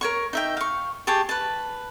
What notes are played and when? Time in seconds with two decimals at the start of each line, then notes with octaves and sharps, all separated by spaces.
0.01 A#4 C#5 C#6
0.33 D#4 E5 G5
0.57 F5 C#6
1.07 G4 G#4 A5 C#6
1.29 B4 A5